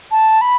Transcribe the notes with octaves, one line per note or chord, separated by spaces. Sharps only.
A5
B5